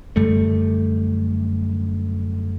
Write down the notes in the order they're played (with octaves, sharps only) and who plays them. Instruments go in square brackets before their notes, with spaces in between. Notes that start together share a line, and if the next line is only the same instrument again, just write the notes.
[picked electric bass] F#2 D3 G3 A3